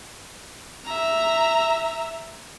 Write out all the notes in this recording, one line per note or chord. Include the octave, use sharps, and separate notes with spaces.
E5 A#5